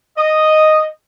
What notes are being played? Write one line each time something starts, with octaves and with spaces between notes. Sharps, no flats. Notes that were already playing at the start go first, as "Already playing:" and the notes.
D#5